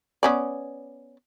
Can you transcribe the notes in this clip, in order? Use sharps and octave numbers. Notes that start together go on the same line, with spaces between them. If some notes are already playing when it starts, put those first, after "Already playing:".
B3 C#4 D5